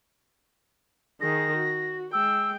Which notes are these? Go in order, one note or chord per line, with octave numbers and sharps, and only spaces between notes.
D#3 G#4 A#6
F#4
G#3 G5 E6